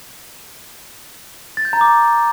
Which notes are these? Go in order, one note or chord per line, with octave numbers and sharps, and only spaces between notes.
A6
G6
A#5
D6